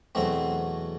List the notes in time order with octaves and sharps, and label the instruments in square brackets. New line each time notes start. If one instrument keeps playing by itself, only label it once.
[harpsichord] E2 B2 F#3 A3 C4